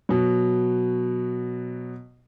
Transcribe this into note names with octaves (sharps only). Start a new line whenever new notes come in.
B2 F#3